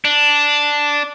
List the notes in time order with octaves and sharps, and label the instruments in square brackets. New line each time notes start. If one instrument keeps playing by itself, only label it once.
[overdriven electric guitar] D4